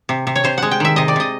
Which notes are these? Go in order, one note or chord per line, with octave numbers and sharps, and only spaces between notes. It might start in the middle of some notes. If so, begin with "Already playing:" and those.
C3
C3
C#5
C3 C5
G#3 F#5
G5
D#3 E5
C3 D#5
D5
C3 D#5